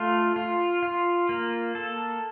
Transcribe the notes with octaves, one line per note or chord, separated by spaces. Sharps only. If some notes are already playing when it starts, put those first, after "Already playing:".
Already playing: A3 F4
F4
F4
A#3
A4